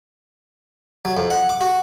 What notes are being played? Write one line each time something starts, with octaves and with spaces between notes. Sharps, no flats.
F#3
F2
F#5
D6
F#4